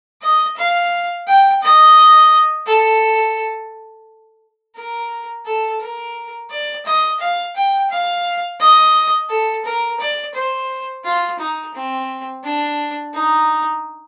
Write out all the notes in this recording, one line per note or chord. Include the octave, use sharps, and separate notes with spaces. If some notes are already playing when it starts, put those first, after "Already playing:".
D#5
F5
G5
D#5
A4
A#4
A4
A#4
D5
D#5
F5
G5
F5
D#5
A4
A#4
D5
C5
F4
D#4
C4
D4
D#4